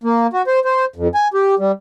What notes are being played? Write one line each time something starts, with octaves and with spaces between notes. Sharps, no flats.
A#3
F#4
C5
C5
F2
G#5
G4
G3